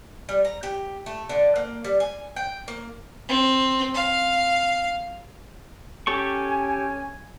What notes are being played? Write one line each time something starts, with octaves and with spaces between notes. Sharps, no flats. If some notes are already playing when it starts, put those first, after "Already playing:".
G3
A#5
G4
A3
D3
A#3
G3
G#5
G5
A#3
C4
F5
C#4 G4 A4 G#5 C#6